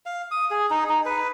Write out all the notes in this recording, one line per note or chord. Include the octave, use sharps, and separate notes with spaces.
F5
D#6
G#4
D#4
D#4
B4